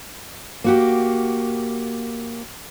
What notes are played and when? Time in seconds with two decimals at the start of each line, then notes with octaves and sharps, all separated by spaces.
0.64 A#3 F#4 G4